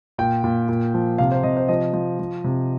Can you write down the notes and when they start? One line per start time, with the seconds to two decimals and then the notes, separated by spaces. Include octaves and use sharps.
0.18 A#2 G5
0.44 A#2
0.69 A#2
0.94 F3
1.18 C3 F5
1.32 C5
1.43 C3 D#5
1.57 C5
1.68 F3 D#5
1.93 F3
2.19 F3
2.44 C3